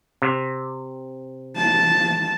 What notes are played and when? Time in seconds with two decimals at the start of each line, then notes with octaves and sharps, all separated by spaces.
0.22 C3
1.57 A5